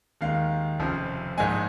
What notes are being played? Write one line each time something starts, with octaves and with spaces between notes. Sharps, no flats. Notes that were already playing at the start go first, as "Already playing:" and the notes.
D#2 D#3 G#3 F5
F1 F2 C#3 F3
A#1 G#2 G#3 G#5